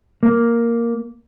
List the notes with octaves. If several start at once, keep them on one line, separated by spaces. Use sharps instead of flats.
A#3